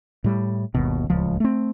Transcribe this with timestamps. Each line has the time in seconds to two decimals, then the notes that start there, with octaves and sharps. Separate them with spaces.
0.24 A2 G3
0.74 G1 D#2 B2
1.10 D1 C#2 F3
1.40 A3 C4